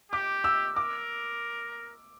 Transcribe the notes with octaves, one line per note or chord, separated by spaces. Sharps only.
G4 D6
E6
A#4 D6